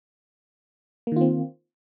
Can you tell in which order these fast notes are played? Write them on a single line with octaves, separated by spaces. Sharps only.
A#3 D#3 F4 C4